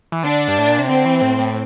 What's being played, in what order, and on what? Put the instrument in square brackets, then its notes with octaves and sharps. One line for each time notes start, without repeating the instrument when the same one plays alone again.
[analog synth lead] E3
[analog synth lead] D3 [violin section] D4
[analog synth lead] G2
A2
A#2
C3
[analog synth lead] D3 [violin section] C4
[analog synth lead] E3
A2
A2